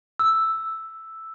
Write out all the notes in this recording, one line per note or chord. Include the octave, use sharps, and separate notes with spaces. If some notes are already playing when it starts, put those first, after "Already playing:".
E6